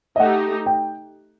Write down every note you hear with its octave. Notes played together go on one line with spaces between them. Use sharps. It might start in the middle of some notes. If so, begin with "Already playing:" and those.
D#5
A3 D#4 G4 F#5
G5